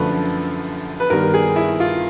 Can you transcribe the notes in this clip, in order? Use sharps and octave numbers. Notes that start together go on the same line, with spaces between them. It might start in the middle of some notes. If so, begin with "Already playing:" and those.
Already playing: F#2 D3 F3 A3 B4
B4
G2 D#3 G3 B3 A#4
G#4
E4
F4